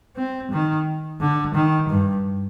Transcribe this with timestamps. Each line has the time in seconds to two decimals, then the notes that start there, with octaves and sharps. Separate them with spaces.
0.16 C4
0.52 D#3
1.20 D3
1.55 D#3
1.89 G2